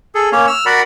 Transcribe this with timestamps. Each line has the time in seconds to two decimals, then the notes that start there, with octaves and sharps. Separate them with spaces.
0.15 G#4 A4
0.32 A#3 C#4 C#5
0.47 E6 F6
0.66 F#4 A#4 D5 F#5 B5